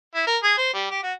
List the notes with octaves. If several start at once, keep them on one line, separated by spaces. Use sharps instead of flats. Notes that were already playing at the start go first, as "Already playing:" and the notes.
E4
A#4
G#4
C5
G3
G4
F#4